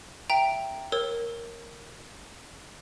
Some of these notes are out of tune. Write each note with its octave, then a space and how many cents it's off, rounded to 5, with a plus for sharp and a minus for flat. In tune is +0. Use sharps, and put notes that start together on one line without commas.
E5 +10 G5 +0 A#5 +0
A#4 +0 C#5 -25 E6 -15